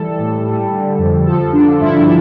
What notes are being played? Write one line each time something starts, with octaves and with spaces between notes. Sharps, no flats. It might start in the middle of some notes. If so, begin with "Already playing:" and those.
Already playing: E3 G3 A4
A2
G3
D3
F2
F3 A4
D3 D4
F4
G2 E4